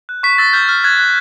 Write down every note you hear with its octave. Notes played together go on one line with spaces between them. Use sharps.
F#6
C#6 B6
E6 A6
F6 G6
F6
F#6 G#6
F#6